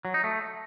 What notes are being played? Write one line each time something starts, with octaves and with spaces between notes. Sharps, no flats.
F#3
D#4
A3